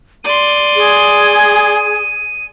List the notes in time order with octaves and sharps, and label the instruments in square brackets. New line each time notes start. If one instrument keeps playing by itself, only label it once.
[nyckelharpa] D5 C6 [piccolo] D#7
[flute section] G#4